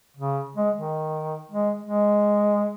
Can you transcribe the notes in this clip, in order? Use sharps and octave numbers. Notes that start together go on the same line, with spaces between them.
C#3
G#3
D#3
G#3
G#3